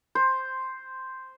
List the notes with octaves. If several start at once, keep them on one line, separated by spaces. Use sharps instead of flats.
C5